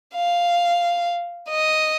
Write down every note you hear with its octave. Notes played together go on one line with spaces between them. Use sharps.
F5
D#5